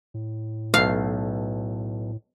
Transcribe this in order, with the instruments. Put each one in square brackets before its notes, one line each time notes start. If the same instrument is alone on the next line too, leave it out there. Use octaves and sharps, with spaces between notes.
[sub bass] A2
[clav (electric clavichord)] B1 A3 [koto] F5